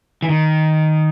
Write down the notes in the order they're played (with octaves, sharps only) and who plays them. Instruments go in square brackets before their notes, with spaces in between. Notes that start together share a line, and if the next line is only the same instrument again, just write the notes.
[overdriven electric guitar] E3
D#3